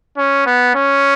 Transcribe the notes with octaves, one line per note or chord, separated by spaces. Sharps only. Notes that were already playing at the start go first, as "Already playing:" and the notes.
C#4
B3
C#4